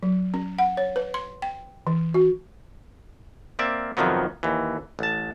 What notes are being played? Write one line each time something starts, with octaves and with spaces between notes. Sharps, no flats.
F#3
C#4
F#5
C#5
B4
C6
G5
E3
F#4
A#3 C4 D5 E5
F2 C3 D#3 F3 F#3 B3
D#2 E3
A1 A5